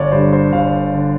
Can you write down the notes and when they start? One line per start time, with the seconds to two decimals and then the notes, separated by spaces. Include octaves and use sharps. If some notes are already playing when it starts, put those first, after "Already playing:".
Already playing: G1 C#5 D5
0.12 G2 D3 C5
0.33 C5
0.53 G1 F5
0.94 D3